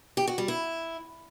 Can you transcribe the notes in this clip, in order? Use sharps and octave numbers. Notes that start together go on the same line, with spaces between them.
G4
F#4
G3
E4